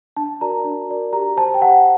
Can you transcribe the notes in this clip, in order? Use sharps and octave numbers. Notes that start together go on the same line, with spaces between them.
D4 A5
F#4 A#4 D5 A#5
D4
F#4 A#4 D5
G4 A#5
C5 A5
G5
G4 F#5